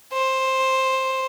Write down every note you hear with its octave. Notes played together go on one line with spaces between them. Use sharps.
C5